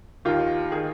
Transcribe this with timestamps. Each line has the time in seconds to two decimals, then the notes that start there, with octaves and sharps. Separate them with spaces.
0.25 D#2 D#3 F4
0.72 D#3 G#4